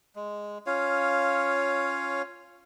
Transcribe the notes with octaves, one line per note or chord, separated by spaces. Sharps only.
G#3
C#4 F4 C#5 F5